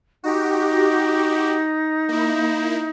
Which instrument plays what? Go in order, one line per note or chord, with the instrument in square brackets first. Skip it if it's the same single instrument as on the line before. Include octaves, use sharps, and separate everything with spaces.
[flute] D#4 [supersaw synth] F#4 G4
[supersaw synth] A#3 E4